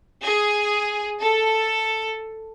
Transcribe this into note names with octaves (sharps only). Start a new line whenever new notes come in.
G#4
A4